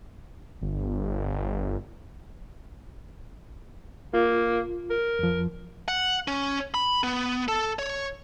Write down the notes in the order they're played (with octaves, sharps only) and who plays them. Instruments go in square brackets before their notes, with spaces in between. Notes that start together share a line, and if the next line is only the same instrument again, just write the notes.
[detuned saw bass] G1
[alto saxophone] A#3 [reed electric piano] F4
[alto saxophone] A#4
[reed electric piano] F2 F3
[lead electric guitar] F#5
C#4
B5
B3
A4
C#5